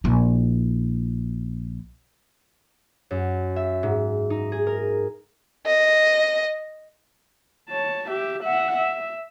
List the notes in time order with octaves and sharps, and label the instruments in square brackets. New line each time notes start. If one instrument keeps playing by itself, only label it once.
[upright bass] A#1 E4
[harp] F#2
E5
G#2
D#4
G#4
A#4
[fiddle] D#5
[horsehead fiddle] C#5 A5
G4 E5
E5 F#5
E5